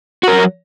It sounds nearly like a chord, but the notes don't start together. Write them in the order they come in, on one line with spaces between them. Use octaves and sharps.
F#4 A#4 F#3